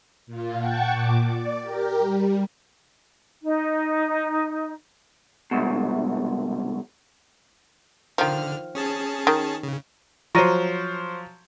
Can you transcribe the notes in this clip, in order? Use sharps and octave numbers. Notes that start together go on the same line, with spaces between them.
A#2 F4
F#5 G5 A5 C#6
A#2 D6
D5
G4 A#4
G3
D#4
C2 F2 G#2 B2
D3 D#3 F3 F6
C#4 G#4 A5
D#3
C#3
F3 F#3 C5 C#5 A#5 C#6 A#6 D#7